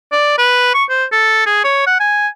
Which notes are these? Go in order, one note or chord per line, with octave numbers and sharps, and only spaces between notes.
D5
B4
C#6
C5
A4
G#4
C#5
F#5
G#5